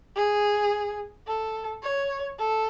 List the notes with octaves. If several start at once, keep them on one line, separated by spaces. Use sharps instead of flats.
G#4
A4
C#5
A4